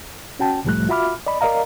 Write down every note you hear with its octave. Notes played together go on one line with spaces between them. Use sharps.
C#4 F#4 G5 A5
C2 A2 F3 G3 A3 F#6
F4 F#4 E5 B5 D6 F6
D5 D#5 B5
A#4 D5 D#5 F5 A#5